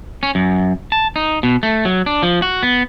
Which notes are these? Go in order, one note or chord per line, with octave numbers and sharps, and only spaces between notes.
C#4
F#2
A5
D#4
B2
A3
F#3
D4
F3
F#4
B3